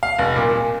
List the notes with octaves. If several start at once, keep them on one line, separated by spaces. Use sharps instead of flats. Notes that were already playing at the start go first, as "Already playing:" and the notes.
F5
F1
A#2
A#2